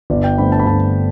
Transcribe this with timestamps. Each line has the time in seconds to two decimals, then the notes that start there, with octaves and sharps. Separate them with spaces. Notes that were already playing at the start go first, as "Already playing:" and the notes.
0.10 G1 D5
0.24 G5
0.38 G2 D3 A3 C4 B5
0.52 A5
0.59 B5
0.66 G1 A5